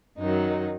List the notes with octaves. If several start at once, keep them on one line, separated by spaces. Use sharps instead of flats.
F#2 D#3 F#3 D#4